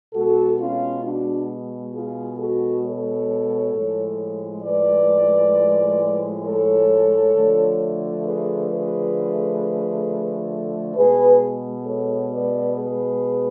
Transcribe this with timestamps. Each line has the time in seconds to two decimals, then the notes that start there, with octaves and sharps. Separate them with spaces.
0.14 B2 G#3 F#4 A4
0.59 C#4 F4
1.04 D4 F#4
1.94 F4 G#4
2.39 F#4 A4
2.85 A4 C#5
3.74 A2 F3 G#3
4.64 B4 D5
6.44 A4 C#5
7.35 D3 F3 A3
8.25 G#4 B4
8.70 G#4 B4
10.95 B2 G#3 G#4 B4
11.85 A4 C#5
12.31 B4 D5
12.75 G#4 B4